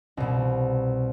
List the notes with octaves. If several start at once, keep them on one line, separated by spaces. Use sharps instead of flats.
C2 B2